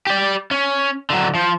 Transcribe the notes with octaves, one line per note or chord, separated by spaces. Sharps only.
G4 D5
C#4
D3 F#3
F3